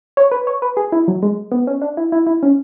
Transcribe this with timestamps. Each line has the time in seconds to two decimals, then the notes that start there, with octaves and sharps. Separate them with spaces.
0.17 C#5
0.32 B4
0.47 C#5
0.62 B4
0.77 G#4
0.92 E4
1.08 F#3
1.23 G#3
1.52 B3
1.67 C#4
1.82 D4
1.97 E4
2.12 E4
2.27 E4
2.43 C#4